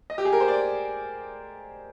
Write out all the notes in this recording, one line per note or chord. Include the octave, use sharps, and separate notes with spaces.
D#5
G4
G#4
A#4
C5
D5